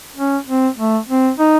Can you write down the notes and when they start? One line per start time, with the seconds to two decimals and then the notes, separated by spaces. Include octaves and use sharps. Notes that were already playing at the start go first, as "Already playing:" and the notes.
0.16 C#4
0.47 C4
0.77 A3
1.09 C4
1.39 D#4